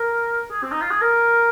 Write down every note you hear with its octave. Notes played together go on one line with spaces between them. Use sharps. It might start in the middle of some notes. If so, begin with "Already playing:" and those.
Already playing: A#4
G#4
C4
D#4
F4
G#4
A#4